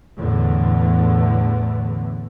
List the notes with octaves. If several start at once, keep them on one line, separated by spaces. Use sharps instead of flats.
E2 A2 D3